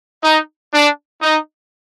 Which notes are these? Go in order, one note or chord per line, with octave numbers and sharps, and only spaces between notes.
D#4
D4
D#4